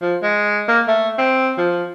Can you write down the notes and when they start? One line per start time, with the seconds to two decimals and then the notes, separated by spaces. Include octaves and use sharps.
0.02 F3
0.22 G#3
0.68 A#3
0.88 A3
1.18 C4
1.58 F3